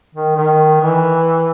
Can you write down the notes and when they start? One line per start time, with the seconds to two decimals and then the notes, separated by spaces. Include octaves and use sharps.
0.15 D#3
0.36 D#3
0.81 E3